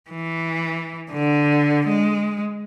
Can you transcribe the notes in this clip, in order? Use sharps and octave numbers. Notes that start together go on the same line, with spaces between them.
E3
D3
G#3